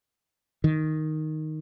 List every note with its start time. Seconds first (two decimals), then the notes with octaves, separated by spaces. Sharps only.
0.64 D#3